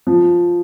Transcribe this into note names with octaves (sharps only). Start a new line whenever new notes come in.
F3